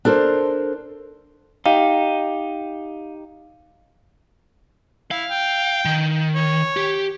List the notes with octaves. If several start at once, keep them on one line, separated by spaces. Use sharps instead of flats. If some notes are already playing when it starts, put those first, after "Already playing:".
D4 A4 A#4 C5
D#4 G4 F5
E4 F5
G5
D#3
C#5
G4